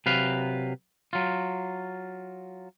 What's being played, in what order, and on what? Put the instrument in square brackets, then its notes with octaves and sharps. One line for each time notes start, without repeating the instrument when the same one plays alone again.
[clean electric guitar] C3 F#3 B4 F5
F#3 F4